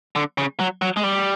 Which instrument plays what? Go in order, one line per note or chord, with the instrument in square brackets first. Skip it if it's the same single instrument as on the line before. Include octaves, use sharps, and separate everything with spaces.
[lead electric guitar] D3
C#3
F#3
F#3
G#3
G3